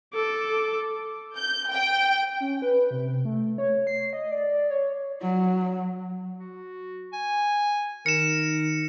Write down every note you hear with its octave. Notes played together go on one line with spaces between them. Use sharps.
A4 D6
G6
G5
C#4
B4
C3
A3
C#5
C7
D#5
D5
C#5
F#3
F#4
G#5
D#3 A#4 C#7 E7